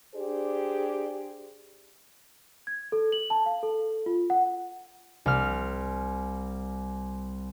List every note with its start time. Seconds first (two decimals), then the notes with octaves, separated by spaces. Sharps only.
0.15 D4 G4 G#4 C5 D5
2.67 G#6
2.92 A4
3.12 F#7
3.30 A5
3.46 F5
3.63 A4
4.06 F4
4.30 F#5
5.26 C2 F6